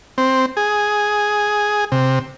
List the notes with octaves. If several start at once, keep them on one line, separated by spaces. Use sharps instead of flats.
C4
G#4
C3